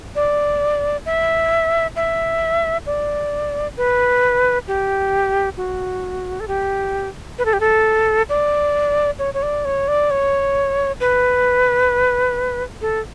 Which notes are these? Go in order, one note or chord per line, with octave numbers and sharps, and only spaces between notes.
D5
E5
E5
D5
B4
G4
F#4
A4
G4
B4
A4
G4
A4
D5
C#5
C#5
D5
C#5
D5
C#5
B4
A4